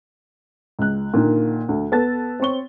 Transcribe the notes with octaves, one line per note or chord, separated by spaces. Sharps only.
C#2 F#6
A#2 D3 D#3 A#3
D2
B3 A4 A5 A6
C4 C#5 C#6 G7